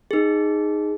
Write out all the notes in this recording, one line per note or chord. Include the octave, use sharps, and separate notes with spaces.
D#4 G#4